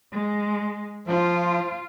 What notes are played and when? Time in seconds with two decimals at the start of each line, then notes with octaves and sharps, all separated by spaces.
0.12 G#3
1.07 F3 F4